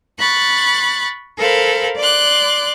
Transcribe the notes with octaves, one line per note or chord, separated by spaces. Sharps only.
B5 C#6 F#6 A6
A4 A#4 C5 F5 B5
D5 C6 D6 F#6